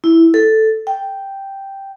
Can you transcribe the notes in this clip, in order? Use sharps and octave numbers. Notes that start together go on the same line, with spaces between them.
E4
A4
G5